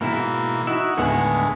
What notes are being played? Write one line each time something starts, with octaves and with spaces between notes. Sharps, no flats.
G#2 B2 E3 A#3 E4
D#4 E4 F#4 E5
D#2 A2 D3 G#3 B3